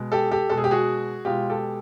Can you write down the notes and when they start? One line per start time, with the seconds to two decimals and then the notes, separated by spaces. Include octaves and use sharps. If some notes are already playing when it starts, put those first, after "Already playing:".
Already playing: B2 G#3
0.12 G4 A4
0.31 G4 A4
0.50 B2 G#3 A4
0.58 G#4
0.64 G4
0.71 F#4 G#4
1.25 B2 G#3 F4 G4
1.50 G4 A4